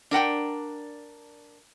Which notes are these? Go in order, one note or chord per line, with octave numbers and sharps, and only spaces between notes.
D4 A#4 F#5 G5